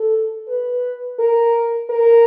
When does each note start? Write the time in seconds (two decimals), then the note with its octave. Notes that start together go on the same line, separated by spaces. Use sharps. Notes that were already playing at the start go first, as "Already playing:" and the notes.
Already playing: A4
0.48 B4
1.19 A#4
1.90 A#4